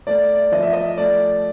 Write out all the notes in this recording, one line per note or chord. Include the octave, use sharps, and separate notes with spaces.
A3 D5
D5
F3 D#5
E5
D#5
A3 D5